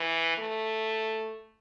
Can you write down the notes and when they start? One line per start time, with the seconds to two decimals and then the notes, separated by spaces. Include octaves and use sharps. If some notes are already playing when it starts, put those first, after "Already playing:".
Already playing: E3
0.38 A3